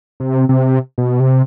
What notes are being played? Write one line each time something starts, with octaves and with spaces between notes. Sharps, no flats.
C3
C3
B2
C3